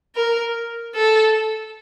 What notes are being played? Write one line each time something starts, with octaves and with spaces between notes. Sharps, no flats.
A#4
A4